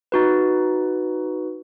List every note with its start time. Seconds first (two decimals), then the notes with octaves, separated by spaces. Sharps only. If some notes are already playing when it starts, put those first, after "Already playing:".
0.12 D#4 F#4 B4